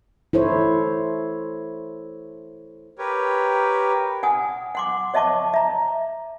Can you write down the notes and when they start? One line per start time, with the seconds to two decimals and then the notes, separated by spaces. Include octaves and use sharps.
0.33 E4 A4 C5 C#5
2.98 G4 A#4 B4 C#5
4.23 F#5 G#5 D#6
4.75 F#5 C6 D6
5.14 C#5 D#5 E5 A5 C#6 D6
5.54 E5 A#5